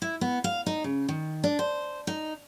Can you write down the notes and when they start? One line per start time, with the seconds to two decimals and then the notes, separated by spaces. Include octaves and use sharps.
0.02 E4
0.21 B3
0.44 F5
0.66 D#4
0.84 C#3
1.09 D#3
1.44 D4
1.59 C5
2.07 D#4